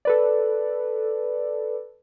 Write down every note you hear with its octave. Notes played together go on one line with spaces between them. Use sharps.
A4 B4 D5